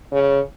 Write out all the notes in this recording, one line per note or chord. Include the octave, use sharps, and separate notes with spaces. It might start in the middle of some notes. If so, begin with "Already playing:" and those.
C#3